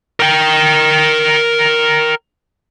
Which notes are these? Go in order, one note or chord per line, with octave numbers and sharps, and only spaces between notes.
A#4 G5